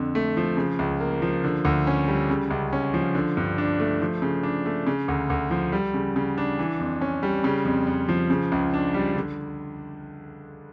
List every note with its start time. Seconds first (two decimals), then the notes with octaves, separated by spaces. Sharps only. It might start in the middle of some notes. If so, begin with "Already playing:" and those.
Already playing: F2 D3
0.15 A3
0.37 F3
0.57 C#3
0.79 C#2
1.00 A#3
1.22 F3
1.44 D3
1.65 D2
1.87 C#4
2.08 G3
2.29 C#3
2.51 C#2
2.73 C#4
2.94 F3
3.15 D3
3.37 G2
3.58 D4
3.80 A3
4.01 F3
4.22 C#3
4.43 D4
4.66 A3
4.87 C#3
5.08 D2
5.30 D2
5.51 F3
5.72 G3
5.94 C#3
6.16 C#3
6.38 D4
6.59 E3
6.80 F2
7.01 C#4
7.23 G3
7.44 C#3
7.65 F2
7.87 F2
8.09 F3
8.30 C#3
8.52 C#2
8.74 D4
8.94 G3
9.16 D3